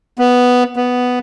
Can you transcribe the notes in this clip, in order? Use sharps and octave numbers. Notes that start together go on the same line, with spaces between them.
B3
B3